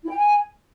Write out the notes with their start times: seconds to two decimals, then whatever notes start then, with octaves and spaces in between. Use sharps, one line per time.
0.04 E4
0.10 G5
0.16 G#5